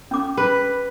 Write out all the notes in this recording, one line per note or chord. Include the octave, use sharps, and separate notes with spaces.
C#4 D6
B4